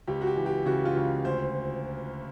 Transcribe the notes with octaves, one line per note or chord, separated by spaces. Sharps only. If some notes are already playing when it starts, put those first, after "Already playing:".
C#2 G4
F#4
G4
E3
G4
C#3 F#4
F4
C#2
D2 C5